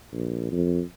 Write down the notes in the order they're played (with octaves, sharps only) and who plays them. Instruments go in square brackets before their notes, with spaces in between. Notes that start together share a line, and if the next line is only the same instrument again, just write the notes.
[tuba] A#1
F2